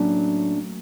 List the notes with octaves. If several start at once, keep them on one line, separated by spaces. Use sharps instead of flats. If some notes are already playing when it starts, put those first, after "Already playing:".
Already playing: A2 F#3 A#3 C#4 D4